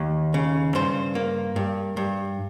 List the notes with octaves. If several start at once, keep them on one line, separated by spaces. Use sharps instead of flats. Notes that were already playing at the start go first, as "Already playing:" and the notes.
Already playing: D#2
C#3
G2 C5
A#3
G2
G2